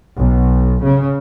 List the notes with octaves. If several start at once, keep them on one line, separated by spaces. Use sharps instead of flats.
B1
C#3